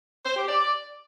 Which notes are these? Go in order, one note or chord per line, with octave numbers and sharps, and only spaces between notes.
C5
G4
D5